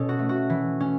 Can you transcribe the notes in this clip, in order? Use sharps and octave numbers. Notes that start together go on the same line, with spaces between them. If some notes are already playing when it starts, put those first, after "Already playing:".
Already playing: B2 C#4 A4 C#5
F#4
A3
F#4
E3
C#4